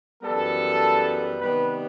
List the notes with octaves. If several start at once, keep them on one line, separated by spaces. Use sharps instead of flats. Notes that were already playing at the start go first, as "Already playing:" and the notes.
F#2 E3 G3 B3 A4
C3 D#3 G3 B3 B4